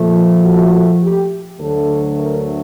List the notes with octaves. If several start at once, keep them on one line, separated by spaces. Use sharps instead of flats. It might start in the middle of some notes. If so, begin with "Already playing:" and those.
Already playing: A#2 F3 A3
F#4
G4
D2 D3 F#3 A3 A4
A#4